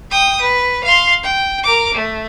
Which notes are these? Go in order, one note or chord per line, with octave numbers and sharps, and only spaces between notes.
G5 D#6
B4
F5 C6
G5
A#4 D6
A3